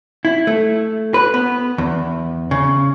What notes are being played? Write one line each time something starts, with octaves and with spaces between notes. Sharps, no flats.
E4
A3
B4
B3
E2
C#3